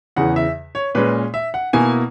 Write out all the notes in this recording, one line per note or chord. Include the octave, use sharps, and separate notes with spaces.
E2 C#3 E3 F#5
E5
C#5
A#2 G#3 C#4 B4
E5
F#5
B2 A#3 E4 G#5